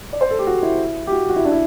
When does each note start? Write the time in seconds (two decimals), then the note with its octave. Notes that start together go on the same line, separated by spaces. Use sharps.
0.13 D5
0.21 C5
0.30 A4
0.39 G4
0.47 F#4
0.63 E4
1.07 G4
1.12 F#4
1.29 F#4
1.36 E4
1.45 D4
1.52 E4